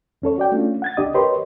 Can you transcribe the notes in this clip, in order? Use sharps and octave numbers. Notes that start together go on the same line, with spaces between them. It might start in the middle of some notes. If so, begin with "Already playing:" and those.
E2 C#4 A4 C#5
F#4 D5 G5
A3 C#4 D4 F4
F#5 G#6 A6
C#2 D4 G4 D5 D#5 D#6
G4 A#4 B4 C#5 D#5 C6